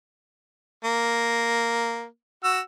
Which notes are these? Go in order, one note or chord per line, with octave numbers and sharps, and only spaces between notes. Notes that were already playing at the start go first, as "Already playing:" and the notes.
A#3
F#4 E6